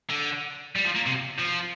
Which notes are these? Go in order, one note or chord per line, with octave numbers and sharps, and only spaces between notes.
D3
G3
F3
A#3
C3
F3